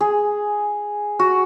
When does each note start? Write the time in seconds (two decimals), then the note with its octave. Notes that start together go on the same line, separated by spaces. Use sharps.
0.01 G#4
1.19 F#4